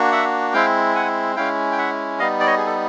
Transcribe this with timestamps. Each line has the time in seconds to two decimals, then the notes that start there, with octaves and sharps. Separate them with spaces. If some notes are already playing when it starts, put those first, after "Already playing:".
Already playing: A#3 D4 F#4
0.12 E5 F#5
0.53 G#3 C4 E4 F5 G5
0.95 F#5 G#5
1.36 G#3 C#4 E4 F5 G5
1.72 G5
1.78 E5 F#5
2.19 G3 B3 D#4 D#5 F5
2.40 D5
2.46 C#5 D#5
2.57 G#4
2.66 A4